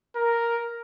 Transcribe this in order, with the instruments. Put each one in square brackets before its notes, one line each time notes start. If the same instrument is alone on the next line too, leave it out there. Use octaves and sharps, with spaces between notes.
[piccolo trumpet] A#4